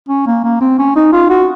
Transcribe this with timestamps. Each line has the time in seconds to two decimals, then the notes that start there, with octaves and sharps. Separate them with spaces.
0.09 C#4
0.27 A#3
0.44 A#3
0.61 C4
0.79 C#4
0.96 D#4
1.12 F4
1.30 F#4